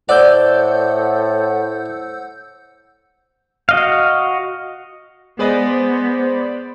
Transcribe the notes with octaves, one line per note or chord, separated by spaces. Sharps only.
A2 C5 D5 F#5 E6 G6
F#4 D#5 F5
G#3 B3 G#4 B4 C5 D5 D#5 B5